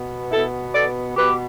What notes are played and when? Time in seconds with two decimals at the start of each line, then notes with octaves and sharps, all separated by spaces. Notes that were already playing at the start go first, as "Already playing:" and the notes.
Already playing: B2 B3
0.31 B2 B3 E4 A4
0.74 A4 D5
1.16 B2 B3 G4 B4